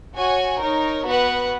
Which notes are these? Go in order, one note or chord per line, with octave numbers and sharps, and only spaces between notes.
F#4 C#5 G#5
D#4 A#4 C#5
B3 F#4 B4 F#5